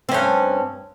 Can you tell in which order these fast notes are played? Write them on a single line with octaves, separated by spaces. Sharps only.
C4 C#4 G2